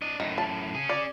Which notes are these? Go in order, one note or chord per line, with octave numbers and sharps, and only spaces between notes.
D4 D#5
F#2 A2 D#3
A5
C#4 G#4
D5